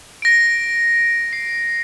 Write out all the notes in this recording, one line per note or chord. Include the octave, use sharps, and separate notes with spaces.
A#6 D7
C7